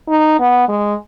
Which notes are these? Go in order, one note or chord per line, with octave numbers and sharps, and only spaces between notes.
D#4
B3
G#3